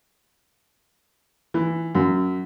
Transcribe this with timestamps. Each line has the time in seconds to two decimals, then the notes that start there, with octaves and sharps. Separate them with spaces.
1.54 E3
1.95 F#2